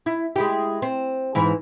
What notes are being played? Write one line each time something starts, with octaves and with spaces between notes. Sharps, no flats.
E4
G#3 E4 G4
C4
G#2 E3